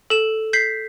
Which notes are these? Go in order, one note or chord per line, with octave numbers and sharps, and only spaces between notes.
A4 E7
G6 B6 C7